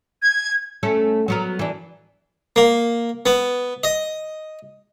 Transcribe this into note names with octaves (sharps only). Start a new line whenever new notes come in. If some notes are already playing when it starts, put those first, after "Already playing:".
G#6
A3 C#4 A4
F#3 B3 A#4
E3 D4
A#3
B3
D#5